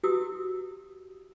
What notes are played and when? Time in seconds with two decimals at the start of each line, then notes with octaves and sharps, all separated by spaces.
0.03 E4 F#4 G4 B4 D#6 E6